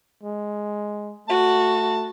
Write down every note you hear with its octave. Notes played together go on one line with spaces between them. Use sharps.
G#3
A3 F#4 A5